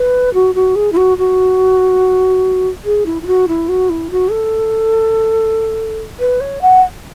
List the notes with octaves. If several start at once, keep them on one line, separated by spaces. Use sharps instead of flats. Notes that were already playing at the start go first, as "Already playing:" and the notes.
Already playing: B4
F#4
F#4
G#4
E4
F#4
F#4
G#4
E4
E4
F#4
E4
F#4
E4
F#4
A4
B4
C#5
F#5